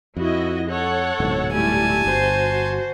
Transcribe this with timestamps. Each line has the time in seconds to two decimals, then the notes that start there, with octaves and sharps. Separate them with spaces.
0.17 F2 E4 F#4 D#5
0.70 A4 C#5 F#5
1.20 D1 G#2 B2
1.52 G3 A3 E4 G#5 A5
2.05 G1 F#4 C5